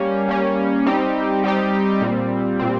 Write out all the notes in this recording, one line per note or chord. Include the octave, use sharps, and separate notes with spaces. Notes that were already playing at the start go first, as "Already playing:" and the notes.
Already playing: G3 A#3 C#4
G3 A#3 C#4
G3 C4 D#4 G4
G3 C4 D#4 G4
A#2 G3 C4
A#2 G3 C4